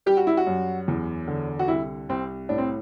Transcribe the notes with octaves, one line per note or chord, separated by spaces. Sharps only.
G3 G4
F#4
E4
F#4
F#2
E2
D3
F#4
C2 E4
C2 C4
A2 D4
C4